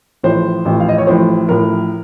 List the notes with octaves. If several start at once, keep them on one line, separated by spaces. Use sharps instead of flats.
A1 A2 F3 C5
A1 A2 F3
F5
D#5
C#5
A1 A2 F3 C5
A1 A2 F3 A#4